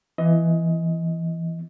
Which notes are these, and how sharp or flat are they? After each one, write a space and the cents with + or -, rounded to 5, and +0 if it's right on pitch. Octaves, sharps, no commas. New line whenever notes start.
E3 +20 B3 +0 D#5 +20